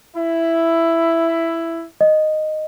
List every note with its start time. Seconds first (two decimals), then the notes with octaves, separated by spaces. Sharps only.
0.16 E4
2.01 D#5